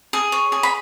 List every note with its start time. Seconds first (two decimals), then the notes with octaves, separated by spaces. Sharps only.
0.13 G#4
0.32 C#5
0.52 G#4
0.63 B5